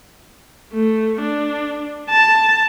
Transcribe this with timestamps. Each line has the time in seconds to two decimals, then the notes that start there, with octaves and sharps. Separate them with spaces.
0.73 A3
1.21 D4
2.10 A5